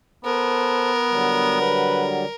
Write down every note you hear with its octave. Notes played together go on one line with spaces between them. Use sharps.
B3 A4 A#4 C5
D3 F#3 G3
B4